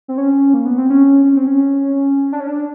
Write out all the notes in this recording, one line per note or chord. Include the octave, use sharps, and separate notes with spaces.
C4
C#4
A#3
B3
C4
C#4
C#4
C4
C#4
D4
C#4
D4